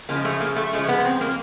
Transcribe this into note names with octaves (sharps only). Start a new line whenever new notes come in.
C#3 F3 G#3 A#3
A3
A#3
A3
C#3 F3 G#3 A3
B3
C4
A#3